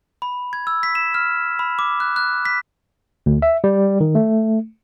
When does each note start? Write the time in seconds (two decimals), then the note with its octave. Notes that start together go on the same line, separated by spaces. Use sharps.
0.22 B5
0.53 G#6
0.67 E6
0.83 B6
0.95 E7
1.14 F6
1.59 B5
1.79 D6
2.00 F#6
2.16 F#6
2.45 B6
3.26 D2
3.42 E5
3.64 G3
4.00 D#3
4.15 A3